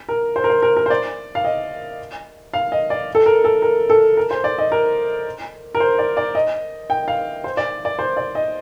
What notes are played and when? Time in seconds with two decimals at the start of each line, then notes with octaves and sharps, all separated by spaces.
0.09 A#4
0.36 C5
0.44 A#4
0.50 C5
0.63 A#4
0.77 A#4
0.86 C5
0.90 D5
1.35 F5
1.44 D#5
2.54 F5
2.72 D#5
2.90 D5
3.15 A4
3.26 A#4
3.44 A4
3.62 A#4
3.90 A4
4.17 A#4
4.31 C5
4.44 D5
4.58 D#5
4.72 A#4
5.75 A#4
5.80 C5
5.99 D5
6.17 D5
6.35 D#5
6.90 G5
7.08 F5
7.44 C5
7.57 D5
7.85 D5
7.99 C5
8.17 D5
8.35 D#5